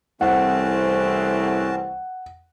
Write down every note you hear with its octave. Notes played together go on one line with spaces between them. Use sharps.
C2 E3 A3 C4 C#4 F#4 F#5 A5